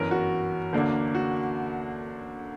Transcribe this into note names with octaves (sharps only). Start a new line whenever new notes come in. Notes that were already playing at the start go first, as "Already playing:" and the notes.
Already playing: G1 F#2 E3 A#4
F#4
D2 D3 A#3 D4
F#4